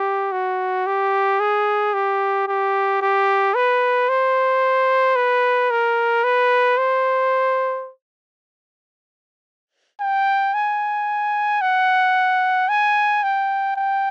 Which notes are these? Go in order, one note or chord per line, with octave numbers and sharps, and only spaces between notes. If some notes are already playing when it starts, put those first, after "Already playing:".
Already playing: G4
F#4
G4
G#4
G4
G4
G4
B4
C5
B4
A#4
B4
C5
G5
G#5
F#5
G#5
G5
G5